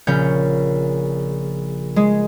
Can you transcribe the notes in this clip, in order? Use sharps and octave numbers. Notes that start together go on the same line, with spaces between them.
A#1 C#3 C#4 G6
G#3 G#4